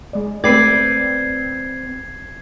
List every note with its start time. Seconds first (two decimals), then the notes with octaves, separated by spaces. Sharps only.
0.13 G#3 D5
0.44 A3 C4 B4 D5 G5 G#6 C7